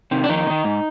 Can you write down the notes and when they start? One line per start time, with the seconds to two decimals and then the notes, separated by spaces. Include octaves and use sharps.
0.11 C3 D#3
0.24 D4
0.29 F2 D#3 D#4
0.47 C3
0.50 D#3
0.64 G#2